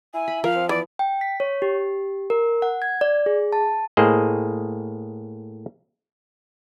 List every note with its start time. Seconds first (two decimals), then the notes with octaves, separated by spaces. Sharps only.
0.14 E4 G#5
0.28 B5
0.44 F3 A#4 F5
0.56 C4
0.69 E3 B3 D5
0.99 G5
1.21 B6
1.40 C#5
1.62 G4
2.30 A#4
2.62 F#5
2.82 G#6
3.01 D5
3.26 G#4
3.53 A5
3.97 A2 A#3 G#4 C5 D#5